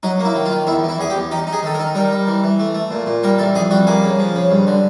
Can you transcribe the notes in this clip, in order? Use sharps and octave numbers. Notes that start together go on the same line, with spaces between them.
F#3 D#4
A#3
E4
D#3
F4
D#3
E2 E4
E3
E4
E2 G#4
G4
E2
D#4 G4
D#4
G#4
D#3 A4
A#4
D#4
G3 A#4
G3
E3
E3
A3
A3
A#2
A#2
G3 A#4
E3 A4
F2 G#4
G3 F#4
A#3 G#4
C#3
F3
C#3
G2
D3